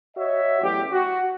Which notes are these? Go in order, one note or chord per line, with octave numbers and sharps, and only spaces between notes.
F#4 C#5 D#5 E5
A1 E2 F#3 G4
F#4